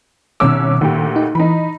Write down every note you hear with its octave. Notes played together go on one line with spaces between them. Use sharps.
C2 B2 D#3 C#4 D6 E6
D2 A#2 D#3 G4
D#4
E3 D#4 B5